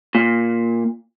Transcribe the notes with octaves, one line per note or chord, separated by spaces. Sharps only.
A#2